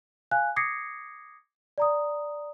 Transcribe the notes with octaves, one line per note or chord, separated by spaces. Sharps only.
F5 G#5 F#6
D6 D#6 G#6 A#6 C7 C#7
D5 A#5 D#6